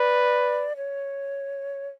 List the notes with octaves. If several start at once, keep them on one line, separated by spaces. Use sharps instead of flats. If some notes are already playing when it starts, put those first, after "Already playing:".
Already playing: B4 D5
C#5